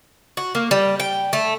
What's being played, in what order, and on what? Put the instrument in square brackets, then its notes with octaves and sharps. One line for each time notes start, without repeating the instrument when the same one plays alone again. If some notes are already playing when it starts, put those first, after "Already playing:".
[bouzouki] F#4
A#3
G3
G5
A3